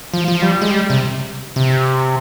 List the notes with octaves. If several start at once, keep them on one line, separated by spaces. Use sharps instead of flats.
F3
F3
G3
G#3
G3
C3
C3